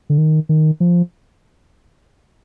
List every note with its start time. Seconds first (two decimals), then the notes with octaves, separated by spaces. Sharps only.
0.10 D3
0.18 D#3
0.49 D#3
0.80 F3